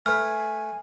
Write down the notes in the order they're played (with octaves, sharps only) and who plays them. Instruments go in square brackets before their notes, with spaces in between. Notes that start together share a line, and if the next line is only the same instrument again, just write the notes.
[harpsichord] A3 B4 [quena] G#5 [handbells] F6